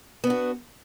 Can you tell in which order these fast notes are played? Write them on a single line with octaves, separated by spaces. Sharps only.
B3 D4 F#4